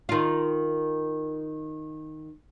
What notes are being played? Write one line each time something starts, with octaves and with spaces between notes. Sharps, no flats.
D#3 F4